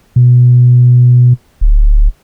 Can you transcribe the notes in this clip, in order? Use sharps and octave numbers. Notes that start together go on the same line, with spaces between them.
B2
D1